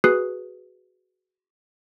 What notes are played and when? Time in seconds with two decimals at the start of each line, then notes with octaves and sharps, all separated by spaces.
0.04 F#4 G#4 B4 D#6 F#6 C7